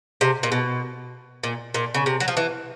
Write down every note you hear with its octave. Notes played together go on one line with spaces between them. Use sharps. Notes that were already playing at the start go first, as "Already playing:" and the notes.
C3
A#2
B2
A#2
A#2
C#3
C3
F#3
F3
E3